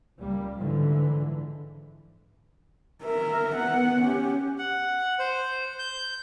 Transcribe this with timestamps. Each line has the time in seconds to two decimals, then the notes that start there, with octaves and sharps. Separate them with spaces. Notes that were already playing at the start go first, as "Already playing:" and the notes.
0.18 C#2 G3 A#3
0.57 G#2 D3 E3 F3
3.03 A#4 E5
3.55 B3 F#5
4.03 C#4 G4
4.59 F#5
5.19 C5
5.79 G6